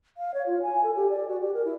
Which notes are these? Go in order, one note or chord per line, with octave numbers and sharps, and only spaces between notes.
F5
C#5
F4
G#5
A4
G4
D5
F#4
G4
A#4
E4